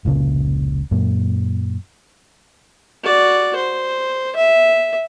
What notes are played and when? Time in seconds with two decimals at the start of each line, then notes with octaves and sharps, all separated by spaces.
0.05 F1 C#2 A#2 C#3
0.91 F#2 A#2
3.03 F#4 D5
3.55 C5
4.35 E5